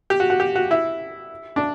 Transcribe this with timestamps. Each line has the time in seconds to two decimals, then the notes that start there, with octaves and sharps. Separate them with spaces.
0.10 G4
0.20 F#4
0.30 F#4
0.40 G4
0.56 F#4
0.71 E4
1.56 D4